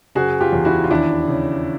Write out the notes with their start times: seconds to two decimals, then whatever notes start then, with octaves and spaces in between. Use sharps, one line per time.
0.15 F#1 F#4 G#4
0.41 F4 G4
0.52 E2
0.65 E4 F#4
0.84 F4
0.91 D#2 D4 E4
1.28 C#3